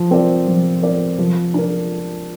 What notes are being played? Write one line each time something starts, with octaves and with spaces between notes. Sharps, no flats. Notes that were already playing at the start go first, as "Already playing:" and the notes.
Already playing: F3
C4 A#4 D5
F3
C4 A#4 D5
F3
D4 A#4